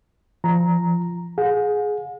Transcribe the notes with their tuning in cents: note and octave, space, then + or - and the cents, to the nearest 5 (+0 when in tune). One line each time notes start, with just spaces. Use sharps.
F3 -15 A#5 +0
G#4 +10 F#5 -45